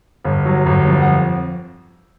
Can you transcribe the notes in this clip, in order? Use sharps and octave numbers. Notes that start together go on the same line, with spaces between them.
G1
F#3
G1
F2
F#5